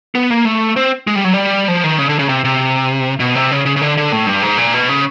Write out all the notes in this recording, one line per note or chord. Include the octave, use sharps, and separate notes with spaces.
B3
A#3
A3
C4
G#3
G3
F#3
G3
F3
D#3
C#3
D3
C#3
C3
C3
B2
C3
C#3
C#3
C#3
D3
D3
A2
G2
G#2
A#2
B2
C#3